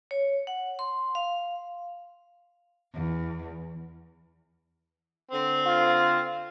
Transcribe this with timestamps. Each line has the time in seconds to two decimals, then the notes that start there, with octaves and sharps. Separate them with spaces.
0.11 C#5
0.47 F#5
0.79 C6
1.15 F5
2.94 E2
5.31 D3 C4
5.66 F4